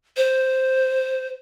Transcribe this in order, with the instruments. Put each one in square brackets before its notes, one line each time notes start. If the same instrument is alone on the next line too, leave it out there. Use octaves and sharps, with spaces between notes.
[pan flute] C5